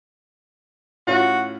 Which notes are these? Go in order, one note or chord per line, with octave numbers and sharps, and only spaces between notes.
A2 C#4 F4 F#4